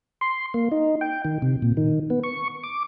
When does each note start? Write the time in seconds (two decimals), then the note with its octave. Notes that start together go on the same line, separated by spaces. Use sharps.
0.21 C6
0.54 A#3
0.72 D#4
1.01 G5
1.25 D#3
1.42 C3
1.62 A#2
1.77 D#3
2.10 B3
2.24 C#6
2.63 D6